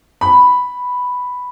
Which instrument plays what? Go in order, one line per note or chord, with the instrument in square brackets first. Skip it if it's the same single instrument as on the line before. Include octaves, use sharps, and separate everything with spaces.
[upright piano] B5